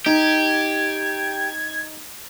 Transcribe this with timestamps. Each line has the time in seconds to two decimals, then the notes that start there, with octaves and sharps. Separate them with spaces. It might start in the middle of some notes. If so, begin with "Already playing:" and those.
0.06 D#4 G4 G#6